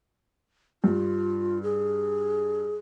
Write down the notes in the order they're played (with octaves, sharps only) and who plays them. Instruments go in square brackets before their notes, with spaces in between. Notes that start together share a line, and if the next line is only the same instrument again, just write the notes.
[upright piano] G2 [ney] F4
[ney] G#4